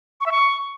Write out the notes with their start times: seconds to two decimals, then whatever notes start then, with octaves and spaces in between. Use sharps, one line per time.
0.21 C#6
0.26 E5
0.32 C#6